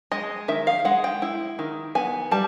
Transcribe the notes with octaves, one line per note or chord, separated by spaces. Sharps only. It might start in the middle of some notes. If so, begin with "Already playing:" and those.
G#3 D#5
D#3 E5
F5
G#3 F#5
G5
E4
D#3
B3 G#5
G3 A5